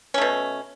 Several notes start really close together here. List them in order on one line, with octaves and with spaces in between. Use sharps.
C#4 A3 B2